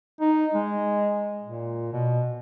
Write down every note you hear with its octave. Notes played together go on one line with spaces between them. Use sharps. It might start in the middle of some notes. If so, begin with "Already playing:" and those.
D#4
G#3
A#2
B2